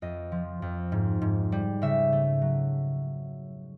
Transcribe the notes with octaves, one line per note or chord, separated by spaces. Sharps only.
F2 D#5
F3
F2
G#2
G#2
G3
C#3 E5
A3
F#3